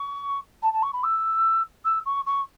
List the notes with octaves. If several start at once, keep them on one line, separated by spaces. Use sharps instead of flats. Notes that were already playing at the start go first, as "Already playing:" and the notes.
Already playing: C#6
A5
A5
C#6
B5
E6
E6
C#6
C#6